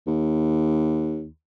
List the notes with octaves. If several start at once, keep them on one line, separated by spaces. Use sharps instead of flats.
D#2